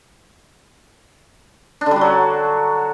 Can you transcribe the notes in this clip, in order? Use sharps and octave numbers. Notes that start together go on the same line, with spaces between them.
D4
D3
G3
F#4
F#3